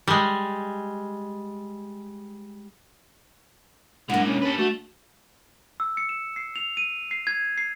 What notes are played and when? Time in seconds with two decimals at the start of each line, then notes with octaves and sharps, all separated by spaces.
0.08 G3 G#3
4.10 E3 G#3 A#3 D4 F#5
4.25 C#4
4.42 A4 B4
4.58 A3 F#4 A4
5.80 E6
5.97 C#7
6.09 E7
6.36 C7
6.56 F7
6.77 D#7
7.11 C7
7.27 G#6
7.58 C7